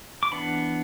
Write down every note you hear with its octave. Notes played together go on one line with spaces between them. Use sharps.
D6
E3 B3 D4 F#5 B5